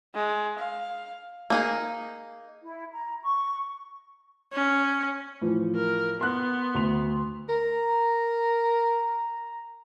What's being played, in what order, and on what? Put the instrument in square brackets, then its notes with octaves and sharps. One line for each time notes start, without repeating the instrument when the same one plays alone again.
[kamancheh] G#3
F5
[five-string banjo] A#3 D#4 G#4
[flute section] E4
A#5
C#6
[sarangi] C#4
[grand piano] A2 E3 F3
[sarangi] A#4
[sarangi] B3 [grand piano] C6 F#6
[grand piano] D2 C6 F7
[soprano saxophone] A#4 [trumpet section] A#5